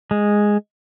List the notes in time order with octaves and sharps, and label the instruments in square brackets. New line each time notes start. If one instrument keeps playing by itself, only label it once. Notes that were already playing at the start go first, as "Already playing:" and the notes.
[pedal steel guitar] G#3